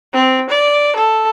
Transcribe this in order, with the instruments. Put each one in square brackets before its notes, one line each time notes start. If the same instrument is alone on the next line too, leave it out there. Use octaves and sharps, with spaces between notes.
[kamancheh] C4
D5
A4